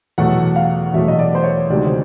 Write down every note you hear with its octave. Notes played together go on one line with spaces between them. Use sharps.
E2 B2 F#3 A3 F#5
F5
E2 B2 F#3 A3 E5
D#5
D5
C5
C#5
D2 C3 D#3 G#3 D5
C5